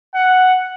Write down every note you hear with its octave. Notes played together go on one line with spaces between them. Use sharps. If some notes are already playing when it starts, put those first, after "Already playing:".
F#5